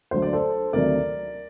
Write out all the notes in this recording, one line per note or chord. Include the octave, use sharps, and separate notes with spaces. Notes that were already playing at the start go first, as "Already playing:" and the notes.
D2 D3 F#3 C5
D5
A4 C5
D2 C3 D#3 F#3 A#4 D5